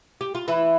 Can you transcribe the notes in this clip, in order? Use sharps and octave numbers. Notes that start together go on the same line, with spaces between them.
G4
F4
E3 E4